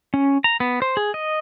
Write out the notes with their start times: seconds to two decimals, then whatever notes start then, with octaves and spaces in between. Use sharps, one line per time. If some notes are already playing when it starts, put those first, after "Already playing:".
0.14 C#4
0.44 A#5
0.60 B3
0.82 C5
0.97 G#4
1.14 D#5